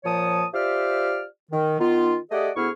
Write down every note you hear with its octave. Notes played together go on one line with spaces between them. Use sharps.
A#2 F3 C#5 A5 D#6
F4 G4 C5 D5 E5 F6
D#3
D#3 B3 D#4 F4
A3 G4 G#4 D5 D#5 F#5
D2 B3 E4 G#4 C#6 F6